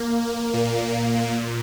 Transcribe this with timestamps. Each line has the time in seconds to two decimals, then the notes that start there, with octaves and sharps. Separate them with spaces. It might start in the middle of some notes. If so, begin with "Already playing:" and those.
Already playing: A#3
0.54 A#2